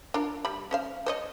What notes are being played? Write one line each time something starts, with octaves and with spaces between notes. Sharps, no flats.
D4 F4 A#4
G3 B5
C#4 C5 F5
C5 C#5 D#5